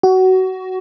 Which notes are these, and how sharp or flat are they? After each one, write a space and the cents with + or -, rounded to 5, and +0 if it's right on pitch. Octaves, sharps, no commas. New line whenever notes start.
F#4 +20